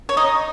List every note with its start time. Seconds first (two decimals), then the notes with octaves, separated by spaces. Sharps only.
0.09 C#5
0.17 D#4 D#5